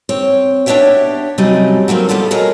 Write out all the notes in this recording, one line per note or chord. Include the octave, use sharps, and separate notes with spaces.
C4 C#5
B3 D4 G4 C#5 E5 G5
C3 F#3 G3 A3 C#4 D#4
F#3 A3 A#3 C4
F3 G3 B3 F4 A4
B2 A3 F#4 G#4 A#4 C#5